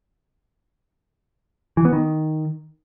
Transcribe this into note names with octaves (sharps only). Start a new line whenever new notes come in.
E3
B3
D#3